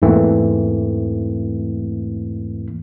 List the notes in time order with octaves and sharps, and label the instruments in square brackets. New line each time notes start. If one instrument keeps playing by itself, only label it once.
[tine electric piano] E2 G#2 E3 A3 A#3 C4